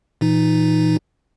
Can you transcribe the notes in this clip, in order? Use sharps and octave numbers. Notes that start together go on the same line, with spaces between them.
A#2 E3 D#4